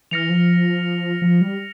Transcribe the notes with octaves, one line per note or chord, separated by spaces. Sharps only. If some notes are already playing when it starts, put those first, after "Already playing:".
E3 F6 A#6 C#7 F7
F3
F3
G3